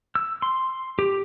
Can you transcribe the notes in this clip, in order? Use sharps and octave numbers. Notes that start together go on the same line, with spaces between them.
E6
C6
G4